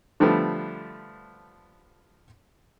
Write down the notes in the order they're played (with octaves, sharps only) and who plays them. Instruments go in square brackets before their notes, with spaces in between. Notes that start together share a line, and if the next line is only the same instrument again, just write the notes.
[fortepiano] D3 F3 G3 A3 B3